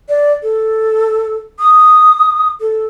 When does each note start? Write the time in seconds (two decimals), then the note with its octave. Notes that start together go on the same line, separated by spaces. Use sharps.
0.09 D5
0.43 A4
1.59 D#6
2.61 A4